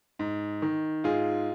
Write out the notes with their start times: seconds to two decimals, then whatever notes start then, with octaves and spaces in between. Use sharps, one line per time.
0.19 G#2
0.62 D#3
1.04 G#2 F4 G#4